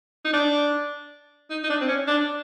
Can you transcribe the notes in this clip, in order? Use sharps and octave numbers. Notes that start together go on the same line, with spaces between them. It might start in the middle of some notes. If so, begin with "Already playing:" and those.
D#4
D4
D#4
D#4
D4
C4
C#4
D4